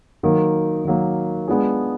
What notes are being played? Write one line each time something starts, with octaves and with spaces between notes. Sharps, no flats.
D#3 F#3 A#3
D#3 F#3 A#3
G#3 B3 D4 F4 G#4